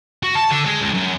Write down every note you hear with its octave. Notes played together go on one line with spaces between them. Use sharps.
F#4
A5
D3
G#3
C#2
F#2